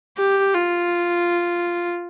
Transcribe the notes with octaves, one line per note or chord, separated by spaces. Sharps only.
G4
F4